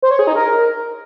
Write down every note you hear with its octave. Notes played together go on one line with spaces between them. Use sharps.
C5
C#5
G#4
D#4
A#4